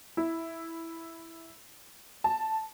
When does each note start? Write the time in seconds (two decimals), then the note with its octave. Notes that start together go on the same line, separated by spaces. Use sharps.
0.17 E4
2.24 A5